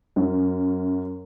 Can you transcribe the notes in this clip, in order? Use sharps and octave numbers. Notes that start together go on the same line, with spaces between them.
F#2